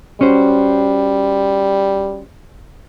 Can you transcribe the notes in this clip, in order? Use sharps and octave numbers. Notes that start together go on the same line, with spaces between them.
G3 C#4 F#4 C5